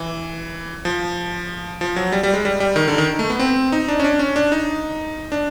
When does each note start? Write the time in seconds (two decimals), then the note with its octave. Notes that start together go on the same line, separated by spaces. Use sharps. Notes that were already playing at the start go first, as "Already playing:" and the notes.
Already playing: E3
0.85 F3
1.81 F3
1.96 F#3
2.12 G3
2.23 G3
2.34 G#3
2.45 G3
2.60 G3
2.76 D#3
2.88 D3
2.98 D#3
3.19 A3
3.30 B3
3.39 C4
3.72 D#4
3.89 D4
4.00 C#4
4.04 D4
4.19 C#4
4.36 D4
4.52 D#4
5.32 D4